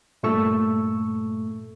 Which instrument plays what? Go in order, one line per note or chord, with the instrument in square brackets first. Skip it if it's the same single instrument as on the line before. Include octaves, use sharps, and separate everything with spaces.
[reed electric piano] G2 A#2 A3 A4 C#6 E6